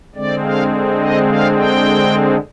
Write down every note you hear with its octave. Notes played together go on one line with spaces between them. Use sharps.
D3 G#3 C4 D5
F5
D#5
F5
G5